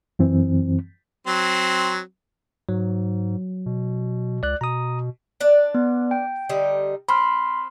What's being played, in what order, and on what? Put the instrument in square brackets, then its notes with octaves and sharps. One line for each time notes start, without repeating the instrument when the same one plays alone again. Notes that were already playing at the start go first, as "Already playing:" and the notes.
[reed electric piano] F#2 E3 C4
[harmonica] F#3 C4
[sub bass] G#2 [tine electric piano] F#3
[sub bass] B2
[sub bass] C#2 [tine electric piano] D5 F#6
[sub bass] B2 [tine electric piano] A#5 D#6
[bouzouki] D4 D5
[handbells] B3
G5
[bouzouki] D3 G3 D#4
[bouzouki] C4 [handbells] B5 C6 F6